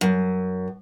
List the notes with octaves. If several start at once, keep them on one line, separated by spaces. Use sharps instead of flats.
F#2